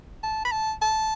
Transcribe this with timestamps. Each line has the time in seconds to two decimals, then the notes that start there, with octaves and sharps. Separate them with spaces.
0.23 A5
0.45 B5
0.52 A5
0.82 A5